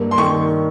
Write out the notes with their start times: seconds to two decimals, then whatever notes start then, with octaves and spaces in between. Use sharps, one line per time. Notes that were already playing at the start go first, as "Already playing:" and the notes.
Already playing: G2 A#3
0.11 C6
0.18 D#3 C#6